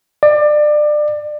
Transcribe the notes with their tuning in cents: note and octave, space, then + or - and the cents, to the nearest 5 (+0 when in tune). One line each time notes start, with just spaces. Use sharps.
D5 +25